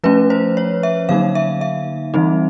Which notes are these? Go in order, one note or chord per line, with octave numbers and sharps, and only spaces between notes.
F3 A3 C#4 B4
C5
C#5
E5
D3 F#3 A#3 D#4 F5
E5
E5
E3 G3 C4 D#4